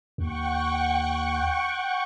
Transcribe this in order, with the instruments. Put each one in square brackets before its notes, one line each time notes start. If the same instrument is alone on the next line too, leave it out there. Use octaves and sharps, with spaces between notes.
[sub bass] D#2 [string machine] F#5 G5 C#6